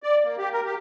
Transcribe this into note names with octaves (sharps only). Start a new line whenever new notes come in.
D5
A#3
G4
A#4
G4